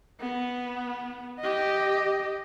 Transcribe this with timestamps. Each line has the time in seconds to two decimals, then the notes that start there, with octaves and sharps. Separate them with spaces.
0.21 B3
1.40 G4 D#5